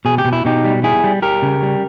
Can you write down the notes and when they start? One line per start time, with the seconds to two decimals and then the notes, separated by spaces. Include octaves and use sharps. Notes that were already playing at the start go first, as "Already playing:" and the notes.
0.05 B2 G#4
0.18 G4
0.25 B2
0.33 E4
0.45 B2 D#4 G4
0.65 G3
0.83 G3 E4 G#4
1.04 G3
1.22 G3 G4 A#4
1.42 C#3
1.62 G3